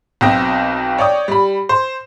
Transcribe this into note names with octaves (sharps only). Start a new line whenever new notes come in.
B1 B2 C4 G5 A#6
C#5 D5 G5 D#6
G3 B5
C5